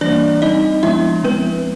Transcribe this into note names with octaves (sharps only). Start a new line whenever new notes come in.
E3 G3 A#3 D4 D5
G3 C4 D#4 D#5
F3 G#3 B3 D4 E4 E5
F3 G#3 B3 C4 B4